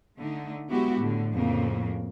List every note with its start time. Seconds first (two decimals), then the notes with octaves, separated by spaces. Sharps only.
0.19 D3 A3 D#4
0.70 F#3 G#3 B3 E4 F#4 G4
0.98 A2 D3
1.33 F2 A2 C#3 A#3